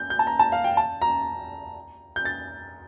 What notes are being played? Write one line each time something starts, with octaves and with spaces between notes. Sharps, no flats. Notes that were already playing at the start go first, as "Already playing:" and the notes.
Already playing: G6
G6
A5
A#5
A5
F5
G5
A5
A#5
G6
A6